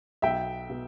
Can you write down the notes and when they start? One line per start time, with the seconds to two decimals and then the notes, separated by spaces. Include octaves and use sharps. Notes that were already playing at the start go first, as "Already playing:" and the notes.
0.22 B1 E5 G5
0.70 B2